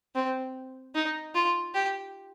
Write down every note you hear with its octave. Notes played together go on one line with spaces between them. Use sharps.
C4
D#4
F4
G4